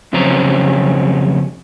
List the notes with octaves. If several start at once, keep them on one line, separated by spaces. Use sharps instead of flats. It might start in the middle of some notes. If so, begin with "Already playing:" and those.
F2 C#3 F#3 C4 C#4 A#5